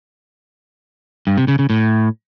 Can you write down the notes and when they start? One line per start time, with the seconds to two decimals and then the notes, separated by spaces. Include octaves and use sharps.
1.27 G2
1.38 C3
1.48 C#3
1.59 C#3
1.70 A2